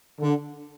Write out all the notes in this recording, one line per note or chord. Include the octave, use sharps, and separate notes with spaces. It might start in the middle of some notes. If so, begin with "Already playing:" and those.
D3